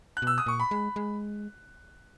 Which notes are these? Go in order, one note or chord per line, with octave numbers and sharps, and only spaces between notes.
F#6
B2 E6
D#6
A#2 C#6
B5
G#3
G#3